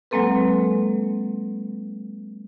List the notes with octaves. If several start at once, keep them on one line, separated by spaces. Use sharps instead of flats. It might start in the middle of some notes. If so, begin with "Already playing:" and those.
F#3 G#3 A#3 C4 A4 B4